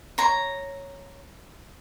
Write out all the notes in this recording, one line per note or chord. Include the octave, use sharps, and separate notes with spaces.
C#5 A#5